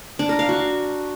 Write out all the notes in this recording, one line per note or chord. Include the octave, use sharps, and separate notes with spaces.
D4
A#4
F5
F#4